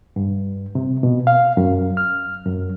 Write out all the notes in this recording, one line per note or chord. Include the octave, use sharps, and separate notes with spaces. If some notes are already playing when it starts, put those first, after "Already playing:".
G2
C3
B2
F5
F#2
F6
F#2